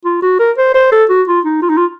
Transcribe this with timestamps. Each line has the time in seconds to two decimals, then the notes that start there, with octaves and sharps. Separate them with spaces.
0.05 F4
0.22 F#4
0.39 A#4
0.58 C5
0.74 C5
0.92 A4
1.10 F#4
1.28 F4
1.45 D#4
1.62 F4
1.69 D#4
1.77 F4